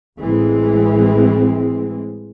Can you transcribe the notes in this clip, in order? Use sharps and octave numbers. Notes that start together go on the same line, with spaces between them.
A1 E3 G#3 C4